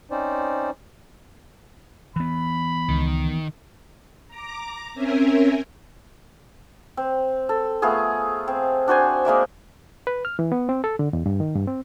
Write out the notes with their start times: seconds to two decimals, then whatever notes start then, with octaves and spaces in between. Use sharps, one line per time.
0.11 C4 C#4 D#4 C5 D5
2.16 E3 B3 B5
2.89 C#2 D#3
4.28 A#5 D6
4.94 C4 C#4 A#4 E5 G#5
6.97 C4
7.49 A4
7.82 A3 B3 F4 G#4
8.48 C4
8.88 D4 F#4 C5 G#5
9.25 G#3 A#3 D5 E5
10.07 B4
10.25 F6
10.39 E3
10.52 B3
10.69 C4
10.84 A4
10.99 D3
11.13 E2
11.26 G2
11.40 D#3
11.56 G2
11.67 C4